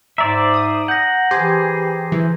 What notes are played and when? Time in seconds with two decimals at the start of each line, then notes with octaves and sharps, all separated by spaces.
0.18 G#2 C5 D5 E5 A#5
0.54 D#6
0.88 F#5 G6 A#6
1.31 E3 G4 G#4 C5
2.12 E3